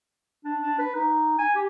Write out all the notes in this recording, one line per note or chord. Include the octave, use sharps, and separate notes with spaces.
D4
D4
B4
D#4
G#5
G4